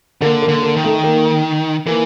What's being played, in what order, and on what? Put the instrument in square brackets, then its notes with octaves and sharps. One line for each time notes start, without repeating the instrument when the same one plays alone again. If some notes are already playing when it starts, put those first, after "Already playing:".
[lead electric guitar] D3 [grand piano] A#3
[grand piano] A#3
[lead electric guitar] D3
[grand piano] A#3
[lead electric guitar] D#3
[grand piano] A3
A#3
[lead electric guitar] E3 [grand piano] A#3